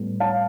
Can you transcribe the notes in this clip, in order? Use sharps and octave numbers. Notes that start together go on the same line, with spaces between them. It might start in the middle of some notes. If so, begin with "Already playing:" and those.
Already playing: A2 G3 B3
F5 A5